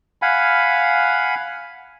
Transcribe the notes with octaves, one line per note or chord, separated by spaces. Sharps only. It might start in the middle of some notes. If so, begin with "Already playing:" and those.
F5 F#5 G#5 B5